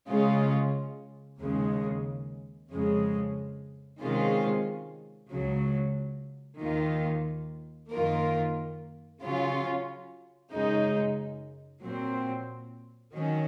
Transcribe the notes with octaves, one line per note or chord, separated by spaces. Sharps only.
C#3 G#3 C#4 F4
D#2 C#3 G#3
F2 C#3 G#3
C3 D#3 G#3 C#4 F4
C#2 C#3 F#3
D#2 D#3 A#3 F4
F#2 D#3 A#3 F4 A#4
C#3 F#3 C#4 F4
F#2 C#3 G#3 D#4
A#2 F#3 C4
D#3 F#3 C#4